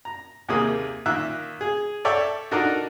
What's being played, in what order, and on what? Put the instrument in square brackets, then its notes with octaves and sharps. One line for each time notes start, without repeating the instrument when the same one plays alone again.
[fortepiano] A#5
D#2 C3 A#3 G#4 D#6
A#2 D#3 A#3 E5 F#6
G#4
A4 C#5 D5 E5 G5
D4 D#4 F#4 A4 A#4 D5